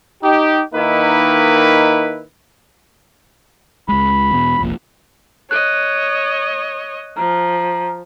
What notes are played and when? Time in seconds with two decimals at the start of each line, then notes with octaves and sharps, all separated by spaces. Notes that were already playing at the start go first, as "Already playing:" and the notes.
0.23 D#4 G4
0.74 D#3 A#3 D#4 E4 B4
3.89 C#2 G#3 B5
4.31 E2 B2
4.61 F1 A#1 A#2
5.51 C#5 D#5 F#6
7.17 F3 A#5